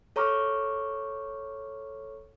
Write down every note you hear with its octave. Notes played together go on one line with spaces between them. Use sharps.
A4 C#5 A#5 C#6 D6 F6